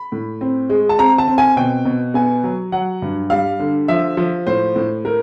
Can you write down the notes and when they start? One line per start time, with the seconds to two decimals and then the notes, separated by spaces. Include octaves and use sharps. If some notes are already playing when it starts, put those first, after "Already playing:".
Already playing: B5
0.12 A2
0.41 C4
0.70 G#3
0.89 A5
0.99 C4 A#5
1.18 A5
1.28 C4
1.38 G#5
1.56 B2 G5
1.85 B2
2.14 B3 G#5
2.44 F#3
2.72 F#3 F#5
3.02 G2
3.30 G3 F5
3.59 D3
3.88 F3 E5
4.17 F3
4.47 A2 C5
4.76 A2
5.05 A3 A#4